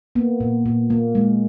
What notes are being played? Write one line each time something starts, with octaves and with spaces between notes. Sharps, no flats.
A#3 B3
A#2
A#2
A#3
G#3